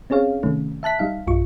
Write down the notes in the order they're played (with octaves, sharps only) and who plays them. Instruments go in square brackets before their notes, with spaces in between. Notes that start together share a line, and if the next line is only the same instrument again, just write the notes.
[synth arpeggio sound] C4 C#4 G#4 C#5 F5
C3 D#3 A3 C#4
E5 A5 F#6 B6
G3 D#4 F5
B1 G2 F4 C#6